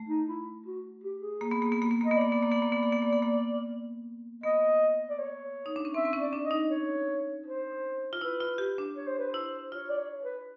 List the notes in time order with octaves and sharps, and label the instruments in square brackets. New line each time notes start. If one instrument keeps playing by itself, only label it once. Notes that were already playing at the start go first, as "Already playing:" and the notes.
Already playing: [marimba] A3
[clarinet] D#4
E4
F#4
G4
G#4
[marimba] A#3
B3
A#3
B3
A#3
B3
[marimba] A#3 [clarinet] D#5
[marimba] B3
[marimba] A#3 [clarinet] D5
[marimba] B3
A#3
B3
A#3
B3
A#3
B3
A#3
B3
A#3
[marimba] B3 [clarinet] D#5
[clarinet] D5
C#5
[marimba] D#4
D4
C#4
[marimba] C4 [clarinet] E5
[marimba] C4
C#4
[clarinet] D5
[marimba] D4
[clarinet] D#5
[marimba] D#4
[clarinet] C#5
C5
[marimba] F4
[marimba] E4 [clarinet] B4
[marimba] F4
G4
D4
[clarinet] C#5
C5
B4
C5
[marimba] E4
[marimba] F4 [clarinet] C#5
[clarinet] D5
C#5
B4